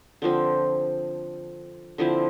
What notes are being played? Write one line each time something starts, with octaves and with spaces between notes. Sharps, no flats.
D3 F3 C4
D3 F3 C4 E4